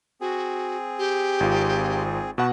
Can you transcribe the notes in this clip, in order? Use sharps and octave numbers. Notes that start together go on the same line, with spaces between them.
C4 F#4 G#4
G4
G#1 F4
B2 B4 F#5 A5 C#6